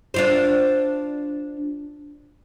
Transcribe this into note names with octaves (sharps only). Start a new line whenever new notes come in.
D4 F4 C5